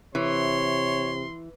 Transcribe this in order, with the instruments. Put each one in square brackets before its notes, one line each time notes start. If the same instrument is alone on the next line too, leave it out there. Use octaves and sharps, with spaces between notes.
[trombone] C3 [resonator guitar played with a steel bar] E3 [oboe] C#5 [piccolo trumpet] C6